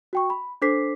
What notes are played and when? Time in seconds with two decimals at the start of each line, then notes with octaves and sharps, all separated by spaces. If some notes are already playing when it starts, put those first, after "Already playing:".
0.13 F#4 G5 C#6
0.30 B5
0.62 D4 A4 C5 D6 B6 C7